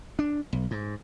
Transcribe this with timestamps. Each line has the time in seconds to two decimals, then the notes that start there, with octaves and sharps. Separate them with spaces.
0.19 D4
0.53 B1
0.71 G#2